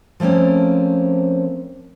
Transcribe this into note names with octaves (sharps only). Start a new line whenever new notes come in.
F3 A3 A#3 C4 C#4